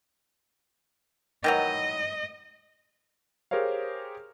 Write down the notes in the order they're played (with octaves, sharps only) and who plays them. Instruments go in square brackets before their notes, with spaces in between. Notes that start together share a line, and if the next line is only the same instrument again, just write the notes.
[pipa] D#3 E3 F#3 [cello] D#5
[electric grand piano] G4 G#4 A#4 C5 C#5 F5